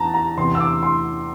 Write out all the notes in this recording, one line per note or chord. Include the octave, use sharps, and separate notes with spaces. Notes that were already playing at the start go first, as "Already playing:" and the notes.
Already playing: E2 A5 A#5
A#5
E2 C3 E3 C6
E6
D6
C6